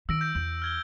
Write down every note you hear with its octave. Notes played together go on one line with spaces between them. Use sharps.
D#3 E6 A#6 D7
G6 A#6 D7
E2 G6
F6 G#6 G7